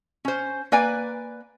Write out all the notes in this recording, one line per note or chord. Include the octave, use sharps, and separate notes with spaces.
C#4 C5
A#3 B4 D5 G#5